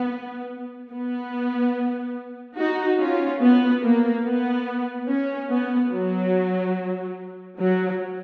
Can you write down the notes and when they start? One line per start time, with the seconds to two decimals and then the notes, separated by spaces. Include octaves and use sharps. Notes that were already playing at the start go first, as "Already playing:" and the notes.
Already playing: B3
0.91 B3
2.58 D#4 F#4
3.00 C#4 F4
3.42 B3
3.83 A#3
4.25 B3
5.08 C#4
5.50 B3
5.92 F#3
7.59 F#3